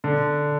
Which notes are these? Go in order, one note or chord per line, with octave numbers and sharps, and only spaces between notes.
D3